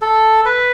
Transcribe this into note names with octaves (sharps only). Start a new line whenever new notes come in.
A4
B4